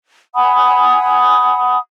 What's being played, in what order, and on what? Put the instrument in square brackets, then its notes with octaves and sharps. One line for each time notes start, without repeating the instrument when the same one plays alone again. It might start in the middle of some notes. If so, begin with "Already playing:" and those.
[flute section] F#5 G#5 B5 D#6